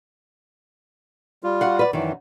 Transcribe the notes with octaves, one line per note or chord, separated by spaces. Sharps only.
G3 F4
F#4 F5 F#5
B4 D5
F#2 D#3 E3